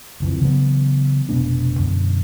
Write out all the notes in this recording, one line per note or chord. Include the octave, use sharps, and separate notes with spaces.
F#1 F2 E3
C#3 E3 F#3 B3
F1 B2 B3 D4
F#2 B2 D3